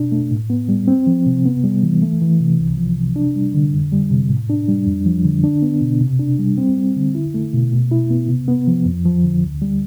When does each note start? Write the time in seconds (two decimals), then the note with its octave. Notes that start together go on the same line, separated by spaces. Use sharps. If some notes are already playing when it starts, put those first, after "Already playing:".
Already playing: B2 D4
0.12 A3
0.31 A2
0.50 B3
0.69 G3
0.88 C4
1.07 F3
1.26 C3
1.46 B3
1.64 G3
1.83 E3
2.02 A3
2.21 E3
2.40 C3
2.59 C2
2.77 F3
2.97 C3
3.16 D4
3.36 G3
3.54 D3
3.73 F2
3.92 G3
4.10 C3
4.29 A2
4.50 D4
4.68 G3
4.87 F2
5.06 F3
5.25 D3
5.44 D4
5.62 B3
5.81 B2
6.01 C3
6.19 D4
6.39 G3
6.58 C4
6.77 G3
6.96 D3
7.15 E4
7.34 A3
7.53 B2
7.72 B2
7.91 E4
8.10 B3
8.28 C3
8.48 B3
8.67 F3
8.85 F2
9.05 F3
9.24 D3
9.43 D2
9.62 G3